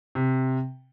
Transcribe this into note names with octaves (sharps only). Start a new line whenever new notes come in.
C3